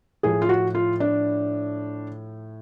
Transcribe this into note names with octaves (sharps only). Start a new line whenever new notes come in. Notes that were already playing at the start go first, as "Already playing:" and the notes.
A2 F3 G#4
F4
F#4
F4
D4